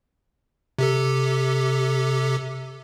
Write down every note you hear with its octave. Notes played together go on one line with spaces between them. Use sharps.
C3 G4 A4